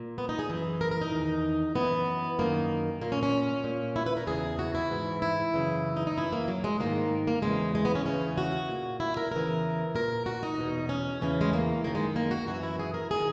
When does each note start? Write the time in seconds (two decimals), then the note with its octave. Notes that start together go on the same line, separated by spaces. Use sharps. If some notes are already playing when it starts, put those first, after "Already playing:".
Already playing: A#2
0.18 B3
0.29 D#4
0.39 G#4
0.50 F#2 E3
0.81 A#4
0.91 A#4
1.02 D#4
1.12 E2 D#3
1.75 F#2 E3 B3
2.39 F#2 D#3 A#3
3.01 A#2 A#3
3.12 C#4
3.23 C#4
3.64 A#2
3.96 E4
4.06 B4
4.17 A#4
4.27 E2 C#3 E3 G#4
4.59 F#4
4.75 E4
4.91 G#2 E3
5.22 E4
5.54 F#2 C#3 E3
5.96 D#4
6.07 D#4
6.17 F#2 E3 E4
6.32 A#3
6.48 F#3
6.64 G#3
6.80 G#2 D#3 A#3
7.27 A#3
7.42 E2 C#3 E3 G#3
7.75 G#3
7.85 B3
7.95 C#4
8.06 E2 C#3 E3 C#4
8.38 F#4
8.69 A#2
9.00 E4
9.17 A#4
9.32 E2 C#3 E3 A#4
9.95 A#2 A#4
10.26 F#4
10.43 D#4
10.58 E2 B2
10.89 C#4
11.21 E2 C#3 E3 C#4
11.41 G#3
11.53 A#3
11.84 F#2 D#3 A#3
11.95 G#3
12.16 A#3
12.31 F#4
12.48 F#2 E3 F#4
12.63 E4
12.79 G#4
12.94 A#4
13.11 D#3 G#4